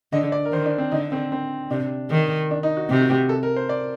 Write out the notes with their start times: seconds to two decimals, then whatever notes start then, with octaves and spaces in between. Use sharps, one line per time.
0.13 D3 D#5
0.32 D5
0.45 A#4
0.52 D#3 C5
0.66 D4
0.78 C4
0.92 D3 D#4
1.12 C4
1.32 C4
1.71 C3 D4
2.10 D#3
2.51 D4
2.63 D#4
2.77 F#4
2.90 C3 G4
3.01 F#4
3.10 G4
3.29 A4
3.43 A#4
3.56 C5
3.69 D5